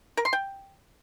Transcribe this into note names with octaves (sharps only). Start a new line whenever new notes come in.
A#4
C6
G5